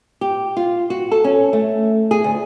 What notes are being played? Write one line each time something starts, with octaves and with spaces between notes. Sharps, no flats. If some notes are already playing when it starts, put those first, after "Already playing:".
G4
F4
F#4
A4
C#4
A3
G#4
D2